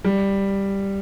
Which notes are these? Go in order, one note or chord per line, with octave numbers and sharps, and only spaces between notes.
G3